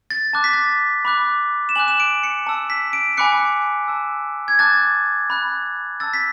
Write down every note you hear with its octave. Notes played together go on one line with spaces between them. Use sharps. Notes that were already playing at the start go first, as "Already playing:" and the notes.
A6
A5 D6 F#6 A6
B6
A6
B5 D6 F#6
E7
G#5 D6 F#6 F#7
E7
D7
C#7
A5 E6
B6
D7
G#5 B5 D6 F#6 C#7
A5 E6
G#6
A5 D6 F#6 A6
B5 F#6
A5 E6 A6
B6